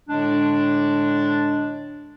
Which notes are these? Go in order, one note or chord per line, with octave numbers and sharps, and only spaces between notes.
A2 D3 G#3 D4